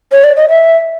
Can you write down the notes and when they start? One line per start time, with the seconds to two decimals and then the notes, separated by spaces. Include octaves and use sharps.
0.12 C#5
0.24 D5
0.37 D#5
0.49 E5